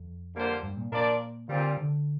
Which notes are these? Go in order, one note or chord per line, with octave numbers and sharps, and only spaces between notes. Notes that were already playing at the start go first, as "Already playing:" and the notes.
Already playing: F2
D3 G3 A#3 F4 C5
G2
A#2
A#2 F3 D4 A#4 D5
A#2 D3 G3 C4 F4
D3